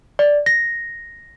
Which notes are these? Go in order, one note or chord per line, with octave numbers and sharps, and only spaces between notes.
D5
A#6